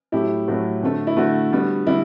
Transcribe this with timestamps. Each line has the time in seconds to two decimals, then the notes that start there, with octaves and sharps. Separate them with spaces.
0.12 A2 F#3 A3 E4 G4
0.48 A2 F#3 A3 F#4
0.83 D3 A3
1.07 E4
1.17 D3 A3 F#4
1.52 D3 G3 B3
1.87 D3 G3 E4